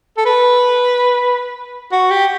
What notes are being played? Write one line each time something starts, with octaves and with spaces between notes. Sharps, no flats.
A4
B4
F#4
G4